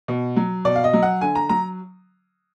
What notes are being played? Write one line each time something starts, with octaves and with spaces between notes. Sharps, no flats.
B2
F#3
B2 D5
F5
D#5
F#3
F#5
D3 G#5
A#5
F#3 A#5